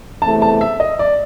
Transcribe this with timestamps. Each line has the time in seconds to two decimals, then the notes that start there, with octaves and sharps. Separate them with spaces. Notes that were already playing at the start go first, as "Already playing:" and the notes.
0.22 E2 C3 E3 A3 A5
0.42 A5
0.61 E5
0.80 D#5
0.99 D5